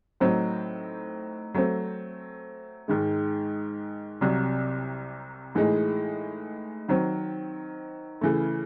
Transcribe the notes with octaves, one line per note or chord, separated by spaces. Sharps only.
A2 F#3 C4 D#4
F#3 A3 C4
G#2 D#3 G#3
C2 C3 F#3
A2 E3 G#3 D#4
D#3 F#3 C4
C#3 E3 A3